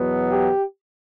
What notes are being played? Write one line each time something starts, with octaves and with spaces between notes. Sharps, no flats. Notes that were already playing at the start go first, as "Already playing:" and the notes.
Already playing: E2 B2 F#3 B3
G4